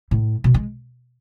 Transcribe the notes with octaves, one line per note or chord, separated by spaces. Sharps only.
A2
B2
G#3